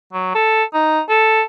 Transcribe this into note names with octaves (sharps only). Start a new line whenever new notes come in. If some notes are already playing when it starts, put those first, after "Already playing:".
F#3
A4
D#4
A4